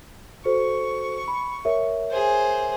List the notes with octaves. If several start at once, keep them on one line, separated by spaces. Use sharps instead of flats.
F#4 A4 C5 C#6
B5
A#4 C#5 E5
G#4 C5